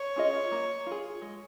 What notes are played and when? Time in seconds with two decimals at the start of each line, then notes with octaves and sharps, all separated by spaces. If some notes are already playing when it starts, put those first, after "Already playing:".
Already playing: C#5
0.16 C#4 F4 G#4 D#5
0.52 A#3
0.86 F4 G#4
1.22 G#3